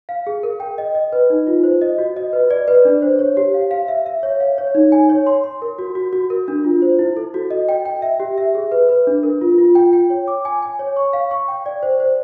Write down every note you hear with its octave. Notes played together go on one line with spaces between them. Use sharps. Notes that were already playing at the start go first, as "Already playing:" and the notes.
F5
G#4
A#4
G5
D#5
D#5
B4
D#4
F4
C5
D#5
F#4
D#5
B4
D5
B4
D4
C5
C#5
G4
F5
F5
E5
E5
C#5
F5
C#5
D#4
G#5
C#5
C6
C6
A#4
F#4
F#4
F#4
A#4
D4
F4
C5
E4
A4
F#4
D#5
G5
G5
E5
G4
E5
G#4
B4
B4
D4
A#4
F4
F4
G5
G5
C#5
D6
G#5
G#5
C#5
C#6
F5
C#6
G5
D5
C5
C5